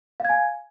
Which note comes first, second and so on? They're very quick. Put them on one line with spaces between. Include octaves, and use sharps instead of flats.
F5 G#6 G#5